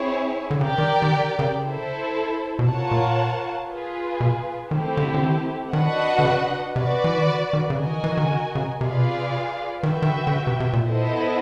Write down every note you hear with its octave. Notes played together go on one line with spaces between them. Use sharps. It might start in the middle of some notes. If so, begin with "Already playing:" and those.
Already playing: C4 E4 G#4 C#5
D3
C#3 G4 A#4 D5 G5
D#3
D#3
D3
C#3
E4 A4 C5
B2
C3 F4 A#4 C#5 F#5 A5
A#2
F4 G#4 B4
B2
D#3 A3 C4 E4 G4
D3
D3
D#3
D#3 D4 F#4 B4 D#5 F#5
D3
C#3
C3 F#4 B4 D5
E3
D#3
D3
D#3
C#3
D3 F#4 A#4 D#5 G#5
E3
D#3
E3
D#3
C#3
D3
C#3
C3 F4 G#4 B4 D5 F5
B2
C3
D#3 F#4 B4 E5 G5
D#3
D3
D3
C#3
C3
C3
A#2
B3 E4 A4 C5 D#5